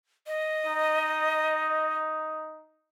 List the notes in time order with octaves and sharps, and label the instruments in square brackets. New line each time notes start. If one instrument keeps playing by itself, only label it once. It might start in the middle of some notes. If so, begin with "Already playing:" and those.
[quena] D#5
[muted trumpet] D#4